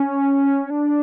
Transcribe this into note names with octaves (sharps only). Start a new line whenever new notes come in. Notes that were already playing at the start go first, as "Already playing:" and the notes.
Already playing: C#4
D4